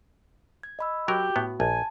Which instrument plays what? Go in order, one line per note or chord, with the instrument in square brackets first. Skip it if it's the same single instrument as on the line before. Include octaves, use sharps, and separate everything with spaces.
[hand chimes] G#6
D#5 B5 E6
[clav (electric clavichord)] F#3 A#4 [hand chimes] F#4 [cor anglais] G4
[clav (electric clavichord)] A2 B3
[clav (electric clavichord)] A#1 [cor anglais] G#5 [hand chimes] A5